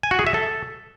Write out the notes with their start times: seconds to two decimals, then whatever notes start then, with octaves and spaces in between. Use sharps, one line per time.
0.03 G#5
0.11 F#4
0.19 G#4
0.27 E5
0.34 A4